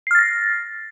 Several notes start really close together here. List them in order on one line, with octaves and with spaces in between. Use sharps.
C7 F6 A6 A#6